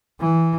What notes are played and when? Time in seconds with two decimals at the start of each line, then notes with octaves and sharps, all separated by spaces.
0.20 E3